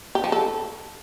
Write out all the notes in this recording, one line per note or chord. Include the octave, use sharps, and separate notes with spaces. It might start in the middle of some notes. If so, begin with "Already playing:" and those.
G4
F3
A4